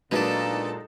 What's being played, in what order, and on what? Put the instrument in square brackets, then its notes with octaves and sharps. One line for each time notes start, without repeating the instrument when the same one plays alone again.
[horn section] A#2 [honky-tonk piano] F#3 G#3 D#4 [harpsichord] B3 D4 [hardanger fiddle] A4 A5